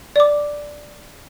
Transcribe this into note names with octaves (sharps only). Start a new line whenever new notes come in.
D5 D6